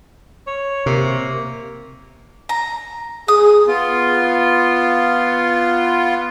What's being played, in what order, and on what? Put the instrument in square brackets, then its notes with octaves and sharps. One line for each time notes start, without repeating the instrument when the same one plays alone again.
[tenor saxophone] C#5
[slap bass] C3 [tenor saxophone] A#3
[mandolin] A#5
[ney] G#4 [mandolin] D#6
[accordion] B3 F4